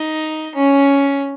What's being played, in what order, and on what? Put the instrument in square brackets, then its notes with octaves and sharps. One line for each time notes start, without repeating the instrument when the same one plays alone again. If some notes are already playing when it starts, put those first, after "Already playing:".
Already playing: [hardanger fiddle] D#4
C#4